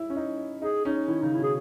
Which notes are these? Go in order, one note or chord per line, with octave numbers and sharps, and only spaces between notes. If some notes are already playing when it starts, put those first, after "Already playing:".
Already playing: E4
C#4
D#4
D#4 G#4
C#4 D#4
D#3 E4
C#3 D#4
E4
B2
G#4